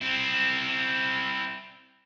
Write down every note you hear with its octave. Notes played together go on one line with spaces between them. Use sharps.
C4 E4